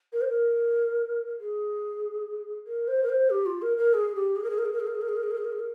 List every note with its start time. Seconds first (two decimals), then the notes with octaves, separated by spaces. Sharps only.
0.13 A#4
0.21 C5
0.29 A#4
1.40 G#4
2.67 A#4
2.88 C5
3.03 A#4
3.09 C5
3.30 G4
3.46 F4
3.62 A#4
3.78 A#4
3.94 G#4
4.15 G4
4.36 G#4
4.44 A#4
4.50 G#4
4.58 A#4
4.65 G#4
4.73 A#4
4.80 G#4
4.87 A#4
4.95 G#4
5.02 A#4
5.09 G#4
5.16 A#4
5.23 G#4
5.31 A#4
5.37 G#4
5.45 A#4
5.52 G#4
5.60 A#4